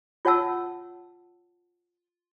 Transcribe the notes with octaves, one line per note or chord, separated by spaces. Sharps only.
F4 C#5 F#5 A5 E6